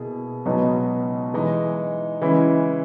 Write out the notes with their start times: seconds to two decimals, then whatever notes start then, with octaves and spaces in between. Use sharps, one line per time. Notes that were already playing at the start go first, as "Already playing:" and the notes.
Already playing: B2 A#3 E4 G#4
0.45 C#2 B2 F#3 B3 D#4
1.34 E3 G#3 D#4
2.22 C#3 E3 G#3 C#4 E4